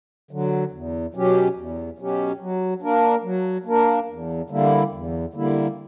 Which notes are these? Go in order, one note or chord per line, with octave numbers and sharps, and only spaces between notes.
D3 F#3
E2
B2 F#3 C#4 G4
E2
B2 F#3 C#4 G4
F#3
A#3 D4 A#4
F#3
A#3 D4 A#4
E2
D3 G3 A#3 E4
E2
D3 G3 A#3 E4